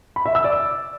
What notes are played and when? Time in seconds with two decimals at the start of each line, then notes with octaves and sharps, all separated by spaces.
0.16 B5
0.26 E5
0.35 E6
0.44 D5